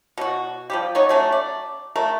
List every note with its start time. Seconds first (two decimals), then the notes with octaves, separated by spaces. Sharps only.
0.18 B2 F#4
0.70 F3 G3 G4
0.95 B3 D#4 C#5
1.09 F#3 A3 C#4
1.32 D5
1.96 A3 A#4